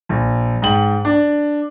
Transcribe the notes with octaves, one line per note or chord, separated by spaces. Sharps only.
A#1
G#2 G5 F#7
D4